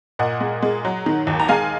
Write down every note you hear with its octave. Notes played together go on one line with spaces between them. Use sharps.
A#2 D#5 F#5
G#3
G#3
F#3
D#3
D#2
A#5
G#3 F5 G#5